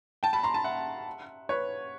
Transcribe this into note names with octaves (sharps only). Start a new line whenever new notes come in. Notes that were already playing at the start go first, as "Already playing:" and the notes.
G5 A5
A5 B5
A#5 C6
A5 B5
E5 F#5
B4 C#5